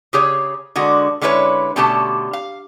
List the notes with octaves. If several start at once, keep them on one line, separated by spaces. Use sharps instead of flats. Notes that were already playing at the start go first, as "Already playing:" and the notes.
C#3 G4 G#4 C#5
D3 G#3 F#4
D3 G#3 C#4 E4 B4 C#5
B2 D3 A3 C#4 G4 A5
F5